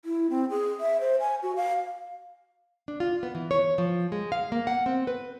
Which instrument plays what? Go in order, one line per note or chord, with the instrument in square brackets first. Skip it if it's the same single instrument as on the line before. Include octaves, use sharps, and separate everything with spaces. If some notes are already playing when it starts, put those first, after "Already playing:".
[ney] E4
C4
G#4
E5
C5
G#5
F#4
F5
[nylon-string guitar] D4
F4
B3
E3
C#5
F3
G#3
F5
A#3
F#5
C4
B4